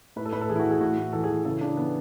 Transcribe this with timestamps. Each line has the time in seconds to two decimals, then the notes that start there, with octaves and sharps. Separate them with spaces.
0.16 A2 B4
0.25 A4
0.33 A2 B4
0.41 A4
0.49 E3 G#4
0.56 E4
0.59 F#4
0.64 E3
0.71 G#4
0.81 A2 F#4
0.98 A2
1.13 E3 A4
1.24 G#4
1.29 E3
1.45 C#3 A4
1.61 C#3 D4
1.77 E3 B3